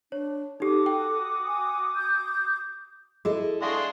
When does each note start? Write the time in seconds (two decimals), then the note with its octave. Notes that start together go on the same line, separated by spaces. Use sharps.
0.12 D4 C#5
0.60 D#4 F#4 G4 A4 D6 D#6
0.86 G5
1.47 G#5
1.96 G6
3.25 E4 F#4 G#4 A4 D#5
3.62 D4 G#4 E5 F5 C6 C#6